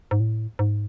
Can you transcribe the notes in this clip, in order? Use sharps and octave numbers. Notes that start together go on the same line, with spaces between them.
G#2
A2
G#2